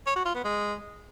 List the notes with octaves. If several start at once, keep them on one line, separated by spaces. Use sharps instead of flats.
C#5
F#4
F4
B3
G#3